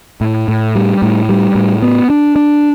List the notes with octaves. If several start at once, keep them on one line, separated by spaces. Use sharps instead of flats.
A2
A2
G3
A2
G3
A2
B3
D4
D4